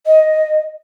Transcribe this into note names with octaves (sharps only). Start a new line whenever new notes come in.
D#5